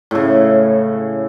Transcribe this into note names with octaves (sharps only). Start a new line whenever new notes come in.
A2 C#3